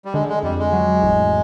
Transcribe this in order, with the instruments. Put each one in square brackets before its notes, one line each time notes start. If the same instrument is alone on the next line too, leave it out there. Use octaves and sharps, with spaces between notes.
[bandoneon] G3
[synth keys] D3 [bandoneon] G#3
[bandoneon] G#3
[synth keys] F2 [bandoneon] G3
[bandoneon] G#3
[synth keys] F#3
A1